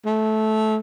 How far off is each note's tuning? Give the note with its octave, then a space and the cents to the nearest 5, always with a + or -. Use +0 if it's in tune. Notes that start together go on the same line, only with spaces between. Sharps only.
A3 -15